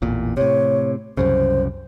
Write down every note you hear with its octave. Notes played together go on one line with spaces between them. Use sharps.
A1 E2 A#2
A2 C3 C#5
C2 F#2 C#3 C5